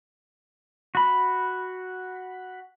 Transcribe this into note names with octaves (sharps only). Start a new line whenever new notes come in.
F#4 B5